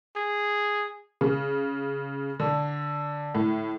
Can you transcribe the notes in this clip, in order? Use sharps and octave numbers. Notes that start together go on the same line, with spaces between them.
G#4
C#3
D3
A2